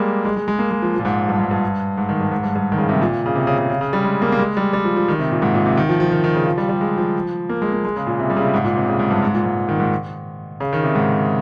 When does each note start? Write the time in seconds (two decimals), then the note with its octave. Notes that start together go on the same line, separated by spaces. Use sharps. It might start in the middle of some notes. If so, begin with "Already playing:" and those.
Already playing: G3 G#3 A#3
0.25 G#3
0.36 G#3
0.48 G#3
0.59 A#3
0.71 G#3
0.82 F3
0.94 F3
0.99 A#2
1.05 G#2
1.29 G2
1.39 G#2
1.51 G2
1.98 G#2
2.09 D#3
2.20 G2
2.31 G#2
2.43 G2
2.55 G2
2.72 D#3
2.78 C#3
2.89 C3
2.95 G#2
3.01 A#2
3.26 C#3
3.35 C3
3.47 C#3
3.58 C#3
3.70 C#3
3.81 C#3
3.93 G3
4.04 G#3
4.22 A#3
4.32 A#3
4.39 G#3
4.57 G3
4.73 G3
4.84 F3
4.96 F3
5.08 D#3
5.19 C3
5.31 A#2
5.42 G#2
5.54 A#2
5.66 C3
5.77 D#3
5.89 F3
6.00 F3
6.12 D#3
6.24 D#3
6.35 C#3
6.46 F3
6.58 G3
6.69 G3
6.81 G#3
6.98 F3
7.49 A#3
7.62 G#3
7.73 A#3
7.85 G#3
7.96 C#3
8.07 A#2
8.19 C3
8.30 G3
8.36 C#3
8.42 C3
8.54 G#2
8.64 A#2
8.77 C3
8.88 C#3
8.99 G#2
9.11 G2
9.22 G#2
9.34 A#2
9.45 G#2
9.69 D#3
9.80 G#2
10.60 C#3
10.73 D#3
10.83 C3
10.95 G#2